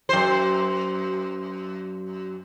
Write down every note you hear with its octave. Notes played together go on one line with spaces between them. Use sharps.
F#2 C5